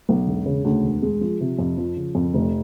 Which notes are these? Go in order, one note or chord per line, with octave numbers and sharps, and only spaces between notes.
B1
E1
C#3
D2
E1
G#3
F3
C3
F2
F3
C#3
F2
F1